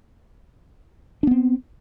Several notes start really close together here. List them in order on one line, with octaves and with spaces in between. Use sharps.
D4 B3 C4